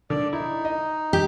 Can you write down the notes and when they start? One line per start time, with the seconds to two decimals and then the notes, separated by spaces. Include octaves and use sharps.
0.10 D3 D5
0.33 D#4 E4
0.65 D#5
1.13 G4